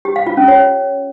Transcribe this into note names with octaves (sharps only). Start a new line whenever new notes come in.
G4
F5
F4
C#4
C#5